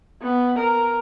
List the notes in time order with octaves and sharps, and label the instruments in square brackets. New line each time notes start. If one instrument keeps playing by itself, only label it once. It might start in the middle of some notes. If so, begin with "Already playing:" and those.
[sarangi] B3
A#4